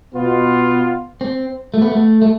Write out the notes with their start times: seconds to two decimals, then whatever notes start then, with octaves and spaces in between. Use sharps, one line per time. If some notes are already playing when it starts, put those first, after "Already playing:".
0.14 B2 B3 F4
1.21 C4
1.74 A3
1.82 B3
1.92 A3
2.22 A3